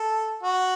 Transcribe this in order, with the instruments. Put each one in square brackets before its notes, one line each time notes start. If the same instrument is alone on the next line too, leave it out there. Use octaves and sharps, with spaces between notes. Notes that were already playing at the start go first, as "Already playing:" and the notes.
Already playing: [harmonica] A4
F#4